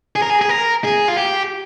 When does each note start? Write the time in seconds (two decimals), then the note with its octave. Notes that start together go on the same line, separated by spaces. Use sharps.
0.16 G#4
0.22 A#4
0.30 G#4
0.41 G#4
0.49 A#4
0.84 G#4
1.08 F4
1.17 G4